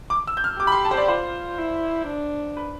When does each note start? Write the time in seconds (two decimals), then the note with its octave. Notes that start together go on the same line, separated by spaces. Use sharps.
0.10 D6
0.27 E6
0.37 G6
0.44 F6
0.60 G4 D6
0.67 B5
0.72 C6
0.85 A5
0.91 C5
0.97 D5
1.08 F4 C5
1.58 E4
2.07 D4
2.57 B4